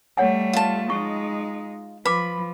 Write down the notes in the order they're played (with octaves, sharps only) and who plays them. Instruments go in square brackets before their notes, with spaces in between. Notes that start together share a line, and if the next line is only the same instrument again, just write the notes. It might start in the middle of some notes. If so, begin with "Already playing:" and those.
[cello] G3 A3 [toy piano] C#5 F#5 G#5
[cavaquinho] F4 A5
[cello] G#3 D#4 [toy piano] C#6
[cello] F3 [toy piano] B4 D6 [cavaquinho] B5